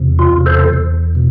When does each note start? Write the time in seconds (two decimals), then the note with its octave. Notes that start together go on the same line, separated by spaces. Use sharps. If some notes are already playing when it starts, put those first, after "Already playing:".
Already playing: E2 C3
0.19 F4
0.33 E2
0.46 A4 C5
0.73 E2
1.15 B2